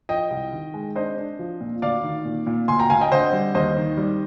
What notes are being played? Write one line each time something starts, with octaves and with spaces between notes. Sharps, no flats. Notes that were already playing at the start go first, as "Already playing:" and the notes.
F3 D#5 G5
C2
D#3
G#3
D4 C5 D#5
D4
F3
A#2
D2 D5 F5
D#3
A#2
A#2
D2 G#5 C6
G5 A#5
D2 F5 G#5
D#5 G5
D3 C5 D#5
G3
D#2 C5 D#5
D#3
G3